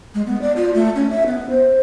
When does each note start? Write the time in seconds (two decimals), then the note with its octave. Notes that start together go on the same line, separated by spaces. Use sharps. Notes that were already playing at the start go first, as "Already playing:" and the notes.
0.15 G#3
0.26 B3
0.42 D5
0.56 F4
0.74 A3
0.95 C#4
1.10 E5
1.26 B3
1.50 C5